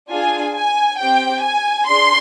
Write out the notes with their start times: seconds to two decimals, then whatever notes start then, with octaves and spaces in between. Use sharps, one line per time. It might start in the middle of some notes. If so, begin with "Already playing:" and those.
0.11 D4 F4 G#4 G#5
0.55 G#5
0.99 C4 G4 G5
1.43 G#5
1.87 D4 G#4 C6